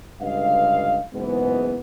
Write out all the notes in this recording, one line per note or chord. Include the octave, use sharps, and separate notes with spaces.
C#2 G2 D3 D#5 F5
F#1 G#2 E3 G#3 B3